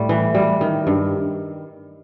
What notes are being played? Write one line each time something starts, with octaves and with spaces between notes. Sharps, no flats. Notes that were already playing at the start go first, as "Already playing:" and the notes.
Already playing: A2 G3
E3
G3
D#3
G2